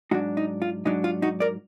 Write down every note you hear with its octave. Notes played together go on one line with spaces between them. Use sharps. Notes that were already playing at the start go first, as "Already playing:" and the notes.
G#2 F#3 D4 D#4 F#4
D#4
F4
G#2 F#3 D4 D#4
F4
D#4 F#4
A#4 D5